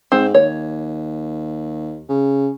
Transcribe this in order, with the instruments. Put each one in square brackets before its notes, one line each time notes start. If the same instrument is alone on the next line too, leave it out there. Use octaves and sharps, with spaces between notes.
[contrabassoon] G#2 [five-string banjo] C4
[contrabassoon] D#2 [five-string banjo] C#5
[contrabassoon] C#3